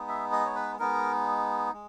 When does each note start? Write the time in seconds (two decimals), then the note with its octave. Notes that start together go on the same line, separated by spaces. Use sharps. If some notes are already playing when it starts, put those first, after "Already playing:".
Already playing: G#3 B3 D#4
0.08 E5
0.32 D#5
0.45 C#5
0.56 B4
0.79 G#3 B3 D#4 A#4
1.73 G#3